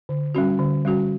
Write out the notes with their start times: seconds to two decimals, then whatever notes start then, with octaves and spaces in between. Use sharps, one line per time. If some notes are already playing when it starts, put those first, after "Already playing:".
0.09 D3
0.35 G3 C#4 F#4
0.59 D3
0.85 G3 C#4 F#4